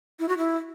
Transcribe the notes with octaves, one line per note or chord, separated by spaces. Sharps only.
E4
F#4
E4